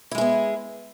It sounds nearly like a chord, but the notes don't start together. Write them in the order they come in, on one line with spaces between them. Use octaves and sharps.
E4 G#3 G#4 B3